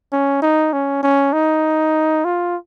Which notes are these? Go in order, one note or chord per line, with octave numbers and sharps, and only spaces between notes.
C#4
D#4
C#4
C#4
D#4
F4